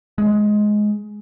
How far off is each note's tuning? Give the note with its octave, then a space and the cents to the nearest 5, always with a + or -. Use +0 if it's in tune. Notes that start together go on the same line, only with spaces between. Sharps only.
G#3 +10